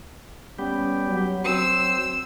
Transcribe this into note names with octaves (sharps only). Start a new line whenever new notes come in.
G3 B3 C#4 G4
F#3
F#3 C4 C5 E6